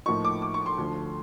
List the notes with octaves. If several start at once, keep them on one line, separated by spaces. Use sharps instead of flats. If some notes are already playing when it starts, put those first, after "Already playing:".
A2 F3 A#3 D#4 C#6
D6
D6
C#6
C6
D2 D3 F3